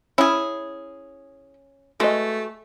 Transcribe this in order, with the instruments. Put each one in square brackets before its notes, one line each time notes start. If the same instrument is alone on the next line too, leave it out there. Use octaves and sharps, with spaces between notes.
[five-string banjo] C#4 [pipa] E4 G#4
[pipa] G#3 [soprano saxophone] A3 [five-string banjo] F#4 B4 D#5